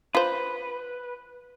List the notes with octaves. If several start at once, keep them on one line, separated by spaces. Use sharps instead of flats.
F4 B4 C5